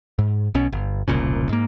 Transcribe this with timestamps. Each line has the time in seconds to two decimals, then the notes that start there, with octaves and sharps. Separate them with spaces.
0.19 G#2
0.54 B1 B2 C#4
0.72 G1
1.08 E1 C2 A#2 C#3
1.49 G#2 A#3